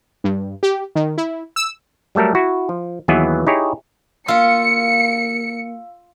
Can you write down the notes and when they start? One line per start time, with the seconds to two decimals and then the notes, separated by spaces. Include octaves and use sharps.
0.24 G2
0.63 G4
0.95 D#3
1.18 E4
1.56 E6
2.15 F#3 G3 A3 A4 A#4
2.35 E4 F#4
2.69 F3
3.08 D#2 E3 F#3 B3 G#4 E5
3.47 D#4 E4 G4 G#4 C#5
4.28 A#3 F4 F5 E6 C#7